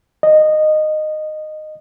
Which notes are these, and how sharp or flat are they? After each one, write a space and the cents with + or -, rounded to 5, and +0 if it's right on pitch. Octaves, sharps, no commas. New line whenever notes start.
D#5 -15